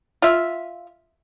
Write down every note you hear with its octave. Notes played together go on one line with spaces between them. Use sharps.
F4 E5